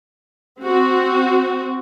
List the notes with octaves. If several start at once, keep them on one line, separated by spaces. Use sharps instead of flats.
C4 F#4